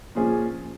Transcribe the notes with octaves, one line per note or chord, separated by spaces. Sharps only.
A#2 F3 C#4 G#4